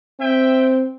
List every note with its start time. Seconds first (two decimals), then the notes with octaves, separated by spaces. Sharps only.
0.20 C4 E5 G5